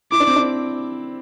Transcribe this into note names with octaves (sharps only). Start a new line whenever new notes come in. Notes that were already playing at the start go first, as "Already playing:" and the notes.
E4 D6
D4
C4
D4